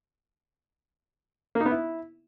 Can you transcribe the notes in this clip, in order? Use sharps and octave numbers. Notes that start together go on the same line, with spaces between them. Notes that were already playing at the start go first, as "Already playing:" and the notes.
A#3
D#4
B3
E4